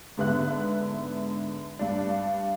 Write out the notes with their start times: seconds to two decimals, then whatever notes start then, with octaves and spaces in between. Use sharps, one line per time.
0.17 G#2 D3 B3 E5 F#6
1.79 G2 D4